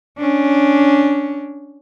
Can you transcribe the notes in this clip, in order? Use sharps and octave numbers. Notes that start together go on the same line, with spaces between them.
C#4 D4